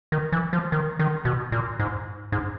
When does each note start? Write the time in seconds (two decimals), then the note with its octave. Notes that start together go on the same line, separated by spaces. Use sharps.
0.12 D#3
0.32 E3
0.53 F3
0.72 D#3
0.99 D#3
1.25 B2
1.52 A#2
1.79 G#2
2.32 G#2